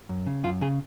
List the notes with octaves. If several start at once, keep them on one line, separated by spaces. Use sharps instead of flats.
F#2
C#3
F#2 F4
C#3 G#4